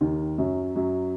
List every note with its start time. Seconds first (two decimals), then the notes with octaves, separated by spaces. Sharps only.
0.01 D#2 D#3
0.38 F#2 F#3
0.76 F#2 F#3